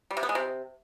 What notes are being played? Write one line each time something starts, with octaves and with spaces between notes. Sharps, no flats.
G3
C3
B3
G#3
C3